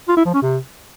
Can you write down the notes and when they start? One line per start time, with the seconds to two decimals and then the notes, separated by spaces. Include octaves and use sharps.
0.08 F4
0.17 E4
0.25 F3
0.34 C#4
0.42 C3